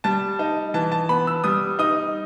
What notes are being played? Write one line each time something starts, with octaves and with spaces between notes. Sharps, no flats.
G3 A5
D#4
E3 A5
A5
B3 B5
E6
G3 D#6
D#4 D#6